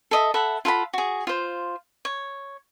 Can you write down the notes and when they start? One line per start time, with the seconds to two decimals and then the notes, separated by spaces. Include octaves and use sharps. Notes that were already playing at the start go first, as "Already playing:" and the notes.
0.11 A4 D#5 E5
0.34 A4 E5 F#5 B5
0.65 F4 A4 F#5 B5
0.93 F#4 G#4
1.27 F4 C5
2.05 C#5